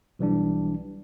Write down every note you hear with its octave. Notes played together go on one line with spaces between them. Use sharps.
B1 E3 G3 D4